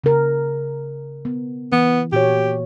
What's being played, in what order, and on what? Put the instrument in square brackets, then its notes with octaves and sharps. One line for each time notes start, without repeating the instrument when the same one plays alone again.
[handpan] C#3 A#4
B3
[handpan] E3 [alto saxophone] B3
[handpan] A#2 F#4 C#5 [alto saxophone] G4